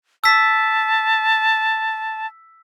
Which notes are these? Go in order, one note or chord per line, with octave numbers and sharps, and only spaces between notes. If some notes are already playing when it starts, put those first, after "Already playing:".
A5 E6 B6